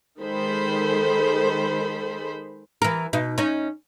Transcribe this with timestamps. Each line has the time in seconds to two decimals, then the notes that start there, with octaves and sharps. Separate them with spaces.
0.19 D#3 G#3 A4 C5 B5
2.82 E3 A#4
3.13 B2 D#4
3.38 C#4 D#4